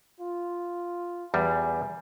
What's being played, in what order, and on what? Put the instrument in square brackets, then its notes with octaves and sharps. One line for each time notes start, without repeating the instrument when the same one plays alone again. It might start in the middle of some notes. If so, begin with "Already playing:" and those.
[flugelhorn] F4
[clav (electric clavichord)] E2 G3 [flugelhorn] G#5